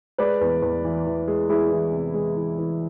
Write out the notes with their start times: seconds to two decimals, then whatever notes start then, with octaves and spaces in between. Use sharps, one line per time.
0.18 G#3 B4 D5
0.41 E2
0.62 E2
0.84 E3
1.07 E3
1.28 G#3
1.49 G#3 E4 G#4
1.72 E3
1.92 C3
2.14 G#3
2.36 E3
2.58 E3